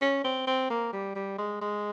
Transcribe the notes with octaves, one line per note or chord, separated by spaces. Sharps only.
C#4
C4
C4
A#3
G3
G3
G#3
G#3